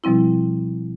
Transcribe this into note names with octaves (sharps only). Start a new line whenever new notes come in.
B2 F3 G3 C4 E4